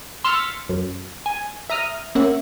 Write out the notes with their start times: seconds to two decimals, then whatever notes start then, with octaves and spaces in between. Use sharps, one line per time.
0.24 C6 E6 F6 A6 B6 C#7
0.69 F#2
1.26 G#5
1.70 E5 A#5 D#6 F6
2.15 A#3 C#4 E5 F#5